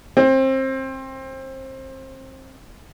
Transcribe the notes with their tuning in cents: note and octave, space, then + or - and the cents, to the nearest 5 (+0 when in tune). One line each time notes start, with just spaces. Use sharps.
C4 +25